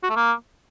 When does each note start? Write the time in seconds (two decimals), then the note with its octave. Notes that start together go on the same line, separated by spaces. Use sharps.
0.03 F#4
0.10 A3
0.16 A#3